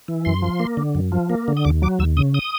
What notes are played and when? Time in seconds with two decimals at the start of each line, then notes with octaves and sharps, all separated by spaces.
0.08 E3
0.25 F#2 C6
0.42 F3
0.60 A#3
0.77 D3
0.95 F#2
1.12 F3
1.30 A#3
1.48 D3
1.57 D#6
1.65 D#2 D6
1.82 F#3 D6
1.99 D#2 E6
2.17 C#3 D#6
2.34 D#6